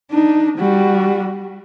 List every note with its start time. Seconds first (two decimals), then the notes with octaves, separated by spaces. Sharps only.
0.12 D4 D#4
0.58 G3 F#4